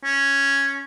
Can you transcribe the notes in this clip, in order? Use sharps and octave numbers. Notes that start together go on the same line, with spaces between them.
C#4